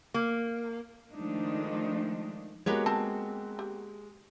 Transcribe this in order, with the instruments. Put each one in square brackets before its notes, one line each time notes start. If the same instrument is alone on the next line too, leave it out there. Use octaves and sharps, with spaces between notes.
[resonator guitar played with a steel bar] A#3
[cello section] D#3 F3 G#3 A3 D4 D#4
[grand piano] G#3 [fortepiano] A#3 B3 F#4 [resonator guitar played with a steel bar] G4 B4 C#5
[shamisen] G3 A5 [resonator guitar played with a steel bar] C4
[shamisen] G4